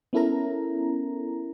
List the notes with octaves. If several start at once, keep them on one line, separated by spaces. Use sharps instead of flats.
B3 C#4 E4 A4 A#4 A#5